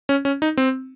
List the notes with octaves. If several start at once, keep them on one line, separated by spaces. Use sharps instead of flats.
C#4
C#4
D#4
C4